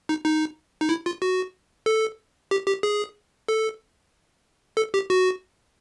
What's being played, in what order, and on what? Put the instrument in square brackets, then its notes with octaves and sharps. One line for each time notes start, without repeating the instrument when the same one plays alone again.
[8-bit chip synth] D#4
D#4
D#4
E4
F4
F#4
A4
G4
G4
G#4
A4
A4
G4
F#4